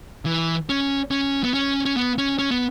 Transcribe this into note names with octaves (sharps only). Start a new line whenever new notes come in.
E3
C#4
C#4
B3
C#4
C#4
B3
C#4
C#4
B3